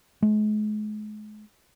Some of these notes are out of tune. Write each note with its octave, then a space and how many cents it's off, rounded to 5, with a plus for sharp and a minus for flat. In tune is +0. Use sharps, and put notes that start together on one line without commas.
G#3 +40